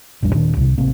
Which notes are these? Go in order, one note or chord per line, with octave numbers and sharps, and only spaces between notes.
A1 E2 G3 D4
D#1 A#2 D#3 D4
C2 C3
A1 C3 A#3 C4